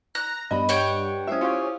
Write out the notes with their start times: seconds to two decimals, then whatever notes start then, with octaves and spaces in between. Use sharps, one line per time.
0.15 A#5 F#6
0.51 G2 B3 D#5 B5
0.69 G4 C#5 F#5 G5
1.27 C#4 E4 C5 E5 D#6
1.41 C#4 F4 G4